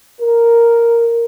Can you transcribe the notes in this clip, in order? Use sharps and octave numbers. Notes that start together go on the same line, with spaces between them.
A#4